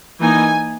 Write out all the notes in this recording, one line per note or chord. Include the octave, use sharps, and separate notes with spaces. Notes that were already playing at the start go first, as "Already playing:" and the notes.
E3 A#3 D#4 G#5